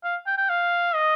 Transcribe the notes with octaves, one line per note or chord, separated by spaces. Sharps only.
F5
G5
G5
F5
D#5